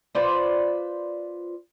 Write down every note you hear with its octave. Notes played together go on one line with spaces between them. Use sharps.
F4 B4 C5 D5